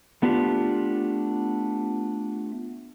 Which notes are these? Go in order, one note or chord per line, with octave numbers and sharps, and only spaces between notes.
A3 B3 D4 F4 G4